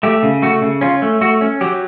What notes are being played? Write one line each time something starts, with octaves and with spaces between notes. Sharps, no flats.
A3 G4
C#3
A3 F#4
C#3
C#4 F4
A3
A3 F#4
C#4
F#3 G4